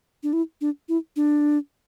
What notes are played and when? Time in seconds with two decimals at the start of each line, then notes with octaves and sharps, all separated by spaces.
0.23 D4
0.33 E4
0.61 D4
0.89 E4
1.16 D4